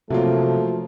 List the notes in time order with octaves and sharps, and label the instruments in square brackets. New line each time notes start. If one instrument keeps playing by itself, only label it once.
[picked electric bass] C3 [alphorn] F3 [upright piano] F#3 A#3 F4 [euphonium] A3